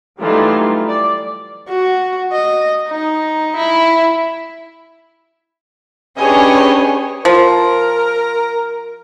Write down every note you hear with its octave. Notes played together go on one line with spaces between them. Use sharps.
E3 F#3 G3 A3 D#4 F4
D5
F#4
D#5
D#4
E4
C#4 D4 G4 G#4 B4 C#5 D#5 G#5
F3 A#4